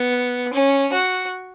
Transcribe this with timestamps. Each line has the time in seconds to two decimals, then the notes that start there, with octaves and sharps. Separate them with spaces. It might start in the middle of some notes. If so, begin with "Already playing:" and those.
Already playing: B3
0.54 C#4
0.92 F#4